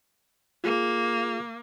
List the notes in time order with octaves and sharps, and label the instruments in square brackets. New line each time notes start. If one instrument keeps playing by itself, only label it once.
[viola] A#3 [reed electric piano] F4 G#4